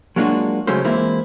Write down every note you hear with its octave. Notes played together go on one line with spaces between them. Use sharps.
F#3 G#3 A#3 D4 F4 F#4
C#3 F#3 G#3 A3 C#4 C5
E3 G#3 A#3 C4 E4 F4